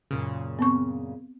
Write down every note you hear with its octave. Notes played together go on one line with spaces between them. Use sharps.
F#2 A#2 C#3
B3 C4 C#6